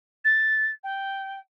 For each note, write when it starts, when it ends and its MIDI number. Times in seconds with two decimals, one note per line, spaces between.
0.24 0.71 93
0.83 1.39 79